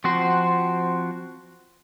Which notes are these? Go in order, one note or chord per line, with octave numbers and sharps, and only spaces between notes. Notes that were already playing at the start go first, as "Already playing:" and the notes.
F3 C4 F#4 C5